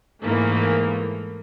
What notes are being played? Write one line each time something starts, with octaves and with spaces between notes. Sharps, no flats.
G#2 E3 A3 A#3